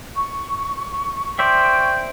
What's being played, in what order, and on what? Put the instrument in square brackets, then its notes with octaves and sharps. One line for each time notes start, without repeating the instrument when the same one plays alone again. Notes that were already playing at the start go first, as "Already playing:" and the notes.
[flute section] C#6
[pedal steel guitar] C5 D5 E5 [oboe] G5 [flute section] C#6